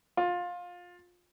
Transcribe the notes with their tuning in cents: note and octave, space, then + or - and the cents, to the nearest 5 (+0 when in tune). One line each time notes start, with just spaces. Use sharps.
F4 +20